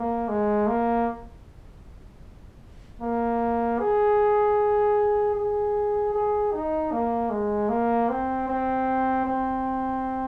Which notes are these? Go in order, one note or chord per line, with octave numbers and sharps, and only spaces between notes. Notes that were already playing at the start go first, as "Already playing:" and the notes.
Already playing: A#3
G#3
A#3
A#3
G#4
G#4
G#4
D#4
A#3
G#3
A#3
C4
C4
C4